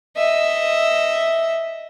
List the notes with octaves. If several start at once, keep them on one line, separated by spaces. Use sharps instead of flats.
D#5 E5